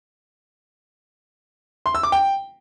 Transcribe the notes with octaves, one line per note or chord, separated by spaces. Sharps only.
C6
E6
D6
G5